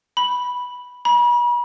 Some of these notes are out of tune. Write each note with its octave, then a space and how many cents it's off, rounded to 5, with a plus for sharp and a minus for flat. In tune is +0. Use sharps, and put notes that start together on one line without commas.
B5 -5
B5 -40